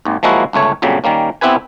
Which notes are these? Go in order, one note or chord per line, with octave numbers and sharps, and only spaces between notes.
G#1 D#2
F3 F#3 G#3 A#3 E4 F#4
G1 C#2 A3 C#5
A#1 F2 C#3 F#3 G3
D#3 G3 A#3 C#4
B3 C4 E4 G4 B4 G#5